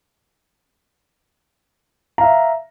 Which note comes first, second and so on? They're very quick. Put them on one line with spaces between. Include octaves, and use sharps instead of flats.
A#5 F5 E5